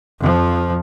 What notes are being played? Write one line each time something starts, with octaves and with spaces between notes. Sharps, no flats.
F2 F3